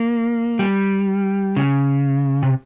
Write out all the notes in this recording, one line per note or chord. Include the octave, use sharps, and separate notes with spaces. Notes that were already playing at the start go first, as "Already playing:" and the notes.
Already playing: A#3
G3
C#3
C3